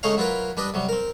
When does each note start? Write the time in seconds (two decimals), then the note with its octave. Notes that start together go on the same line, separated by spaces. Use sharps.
0.03 C#3 G#3 A3 D#4 C#5 F5
0.17 F#3 E4 F4 A#4 B4
0.57 G3 D4 B4 D#5
0.74 C3 F#3 G3
0.89 C4 A#4